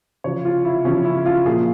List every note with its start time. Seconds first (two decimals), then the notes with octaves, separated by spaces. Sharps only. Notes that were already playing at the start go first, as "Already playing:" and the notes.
0.24 C#3 F3 C#5
0.45 F4
0.65 E4
0.85 C#3 F3 C#4
1.05 E4
1.26 F4
1.45 A#2 F3 G#4